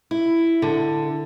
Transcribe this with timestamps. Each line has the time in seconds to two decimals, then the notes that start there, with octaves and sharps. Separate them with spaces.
0.11 E4
0.62 D3